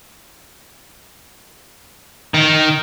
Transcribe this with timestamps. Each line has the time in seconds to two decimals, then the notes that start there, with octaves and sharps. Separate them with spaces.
2.34 D#3